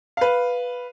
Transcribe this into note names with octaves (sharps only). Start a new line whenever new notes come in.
B4 F5